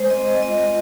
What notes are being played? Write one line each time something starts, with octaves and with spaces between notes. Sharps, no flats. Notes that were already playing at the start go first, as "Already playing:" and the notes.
Already playing: G#3 C5
C4 D#5
G#3 D#5
F4 D#5
F4